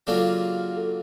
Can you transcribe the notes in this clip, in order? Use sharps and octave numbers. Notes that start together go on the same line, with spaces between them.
C#3 F#3 A#3 D4 F4 A4
A4